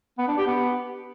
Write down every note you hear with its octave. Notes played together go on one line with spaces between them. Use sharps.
B3
D4
G4
B3